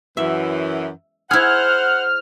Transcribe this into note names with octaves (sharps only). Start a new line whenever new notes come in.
F#2 E3 E5
E4 G#4 C5 F#5 F6